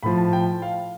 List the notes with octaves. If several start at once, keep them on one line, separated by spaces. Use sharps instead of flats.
A2 F3 B5
A5
G5
F5